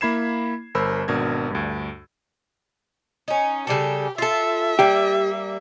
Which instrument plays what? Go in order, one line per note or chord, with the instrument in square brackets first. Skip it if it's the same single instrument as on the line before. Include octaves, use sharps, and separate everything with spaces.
[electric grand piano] A#3 E4 B5 G#6 C7 E7
G1 A#4 C5 B5 E6
G#1 B2 D4 A#4 G#6
D2 G2
[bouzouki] C#4 D#4
[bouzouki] C#3 G3 A4 [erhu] G4
[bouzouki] F4 A4 [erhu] E5
[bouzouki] G3 A#3 [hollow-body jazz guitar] G4